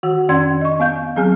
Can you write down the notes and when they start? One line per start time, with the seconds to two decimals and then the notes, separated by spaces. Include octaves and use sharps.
0.03 D#3 F#4 F#5
0.29 F2 D#3 C#4 D5 C6 G#6
0.61 D#5 C#6
0.80 B3 F5 G6
1.16 F#3 C4 G#4 G#5 F6